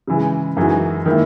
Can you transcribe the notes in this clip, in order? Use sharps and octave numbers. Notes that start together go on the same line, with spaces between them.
C#3 E3 G#3
F#2 E3 G#3 D#4 F#4
D#3 A#3 E4